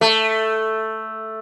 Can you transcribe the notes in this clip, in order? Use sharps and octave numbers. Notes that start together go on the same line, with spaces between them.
A3